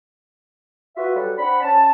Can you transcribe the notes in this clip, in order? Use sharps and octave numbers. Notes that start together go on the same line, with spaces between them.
F4 F#4 B4 E5
F#3 G3 A4 B4
C4 D4 F#5 B5
C#4 A5